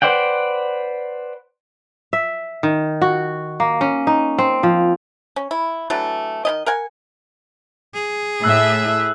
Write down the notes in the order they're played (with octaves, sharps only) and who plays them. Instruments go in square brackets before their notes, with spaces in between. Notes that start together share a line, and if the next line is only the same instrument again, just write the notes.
[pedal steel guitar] B4 C5 D5 F#5 G5
[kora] E5
D#3
F#4
A#3
C#4
D#4
C4
F3
[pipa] C#4
E4
E3 F#3 A3 D4
D#3 C#4 D#5
A#4 F#5 G#5
[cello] G#4
[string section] A2 E5 [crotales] E6 F#6